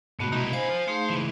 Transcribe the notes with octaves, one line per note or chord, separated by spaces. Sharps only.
G#2 B2 A3 B3 F#4
C2 B2 D#4 E4 A#5
C5 F5 G#5
F3
A3 D#4 G#4 C5
C#2 E3